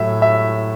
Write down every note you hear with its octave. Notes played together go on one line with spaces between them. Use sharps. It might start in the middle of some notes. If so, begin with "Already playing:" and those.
Already playing: A2 F#3 A3 E5
E5